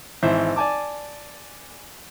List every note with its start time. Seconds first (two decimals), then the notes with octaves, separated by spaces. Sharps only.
0.23 G#1 E3 C5 E5
0.56 D5 G#5 A5 D6